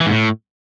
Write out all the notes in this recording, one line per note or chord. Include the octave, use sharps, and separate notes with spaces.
E3
G#2
A2